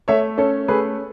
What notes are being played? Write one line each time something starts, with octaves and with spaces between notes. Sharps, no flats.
A3 C#5 E5
C#4 A4 C#5
A3 G#4 B4